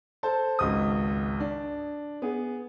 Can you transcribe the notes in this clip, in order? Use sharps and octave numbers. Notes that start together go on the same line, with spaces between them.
A4 C5 A5
G#1 C#2 D#6
D4
B3 G#4